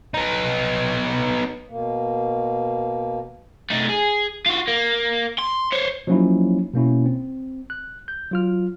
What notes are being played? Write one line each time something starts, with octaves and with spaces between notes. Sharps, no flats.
B3 D#4
B2 A#3
A3 D#4
G#4
F4 F#4
A#3
C6
C5 C#5
F3 F#3 A#3 C#4 D#4 E4
B2 A#3 C#4 E4
C4
F#6
G6
F#3 F4 F6